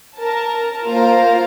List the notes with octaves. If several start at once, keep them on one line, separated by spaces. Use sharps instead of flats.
A#4 A5
A#3 F4 A#4 C5 F5